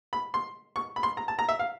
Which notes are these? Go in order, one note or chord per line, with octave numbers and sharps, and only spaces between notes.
B5
C6
C#6
B5
C6
A#5
A5
A#5
E5
F5